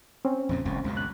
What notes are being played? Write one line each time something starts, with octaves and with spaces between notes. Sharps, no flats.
C4 C#4
F2 A#2 C#3
F#1 C#2 A2
C#2 F#2 B2
F#6